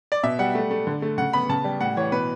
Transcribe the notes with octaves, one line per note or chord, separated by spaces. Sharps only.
D5
B2 E5
G3 F#5
A3
A3
D3
A3
C#3 F#5
B3 B5
C#3 A5
G3
A2 F#5
E3 C#5
B2 B4